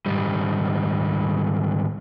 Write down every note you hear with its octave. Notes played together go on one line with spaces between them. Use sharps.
G#2 D#3 G3